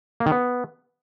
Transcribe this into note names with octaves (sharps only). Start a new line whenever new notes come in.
A#3
D#3
B3